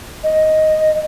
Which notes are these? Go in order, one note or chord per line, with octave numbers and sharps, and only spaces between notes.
D#5